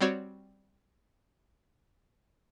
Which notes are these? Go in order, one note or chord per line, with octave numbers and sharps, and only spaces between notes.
G3 C4 F#4 C#5 D5